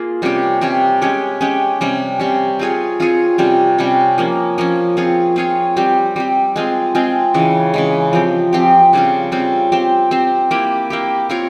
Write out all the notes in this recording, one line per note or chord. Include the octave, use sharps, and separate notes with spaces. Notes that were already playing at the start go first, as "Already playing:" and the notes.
Already playing: A#3 F4 G#4
C3 G3 C#4 G4
C3 G3 C#4 G4
G#3 C#4 G4 C#5
G#3 C#4 G4 C#5
C3 G3 C#4
C3 G3 C#4
C4 F4 G#4 C#5
C4 F4 G#4 C#5
C3 G3 C#4
C3 G3 C#4
F3 A#3 C#4
F3 A#3 C#4
C4 F4 G#4 C#5
C4 F4 G#4 C#5
G3 C4 G4
G3 C4 G4
G#3 C4 F4 G#4
G#3 C4 F4 G#4
C#3 E3 G#3
C#3 E3 G#3
F3 C4 G4
F3 C4 G4
C#3 G3 C4 F4
C#3 G3 C4 F4
C4 G4 C5
C4 G4 C5
A#3 E4 G4
A#3 E4 G4
C4 F4 A#4 C#5